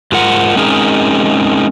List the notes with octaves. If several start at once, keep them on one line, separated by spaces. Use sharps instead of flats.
G#2 F4 A#4 F#5
G#3 C4 C#4 D#4 G#4 A#4